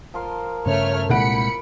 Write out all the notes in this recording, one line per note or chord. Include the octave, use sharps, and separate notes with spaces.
F3 A#4 C6
G2 C#3 A3 C#4 C#5 F6
C2 A#2 G#3 F#5 B5 C#7 D7